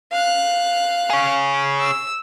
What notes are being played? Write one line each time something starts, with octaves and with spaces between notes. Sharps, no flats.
F5 F#6
G#4 C#5
E6